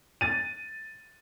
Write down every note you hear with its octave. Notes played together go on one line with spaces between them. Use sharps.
A6 D#7